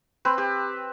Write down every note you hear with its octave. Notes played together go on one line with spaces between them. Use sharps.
C4 B4
G4